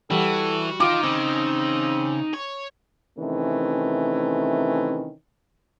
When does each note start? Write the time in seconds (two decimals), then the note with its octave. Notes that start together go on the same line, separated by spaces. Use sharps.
0.10 E3 G3 F#4 A4
0.80 D#4 F4 G5 D6
1.03 C#3 C4
2.34 C#5
3.19 C3 D#3 E3 A3 C#4